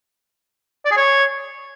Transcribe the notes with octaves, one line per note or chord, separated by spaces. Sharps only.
D5
G#4
C#5